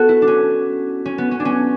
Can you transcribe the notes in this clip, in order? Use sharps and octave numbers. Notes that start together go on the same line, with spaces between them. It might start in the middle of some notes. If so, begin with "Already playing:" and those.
Already playing: B3 F#4 A4
E4
D4
C#4
C#4
B3
C#4
D4
C#4